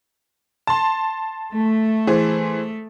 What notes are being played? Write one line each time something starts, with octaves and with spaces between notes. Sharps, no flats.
A5 C6
A3
E3 G#4 C5